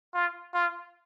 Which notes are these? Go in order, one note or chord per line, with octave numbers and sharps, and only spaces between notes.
F4
F4